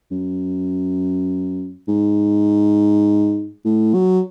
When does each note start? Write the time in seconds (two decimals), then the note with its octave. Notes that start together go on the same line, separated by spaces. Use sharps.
0.11 F#2
1.88 G#2
3.64 A2
3.94 F#3